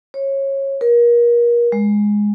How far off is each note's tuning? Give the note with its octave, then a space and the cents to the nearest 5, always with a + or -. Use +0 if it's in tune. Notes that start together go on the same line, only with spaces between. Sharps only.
C#5 -20
A#4 +30
G#3 -5